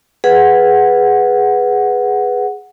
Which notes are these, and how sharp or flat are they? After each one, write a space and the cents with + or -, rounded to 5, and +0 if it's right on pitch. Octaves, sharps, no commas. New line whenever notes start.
G#4 +0 B4 +0 F#5 +0